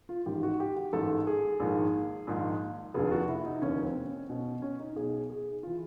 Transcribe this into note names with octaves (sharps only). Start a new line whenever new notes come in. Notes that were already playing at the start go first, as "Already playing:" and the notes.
F4
A1 G#2 D#3 G4
F#4
G4
G4
A1 G#2 D#3 A4
G#4
A#1 G#2 D#3
A#1 G#2 D#3
F1 D#2 D3 G#4
F4
F#4
E4
D#4
F1 D#2 D3 C#4
C4
C#4
B1 B2 C#4
C#4
D#4
B1 B2 G#4
G#4
E3 F4